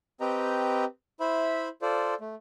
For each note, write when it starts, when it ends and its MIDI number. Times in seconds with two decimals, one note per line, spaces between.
0.21 0.85 60
0.21 0.85 67
0.21 0.85 71
0.21 0.85 75
0.21 0.85 79
0.21 0.85 82
1.20 1.68 64
1.20 1.68 72
1.20 1.68 76
1.20 1.68 83
1.82 2.14 65
1.82 2.14 69
1.82 2.14 72
1.82 2.14 74
2.21 2.35 57